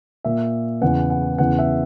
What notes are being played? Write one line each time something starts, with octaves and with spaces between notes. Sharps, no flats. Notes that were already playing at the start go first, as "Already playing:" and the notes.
A#2 E5
E2 C#3 E3 F#5
F#5
E2 C#3 E3 F#5
E5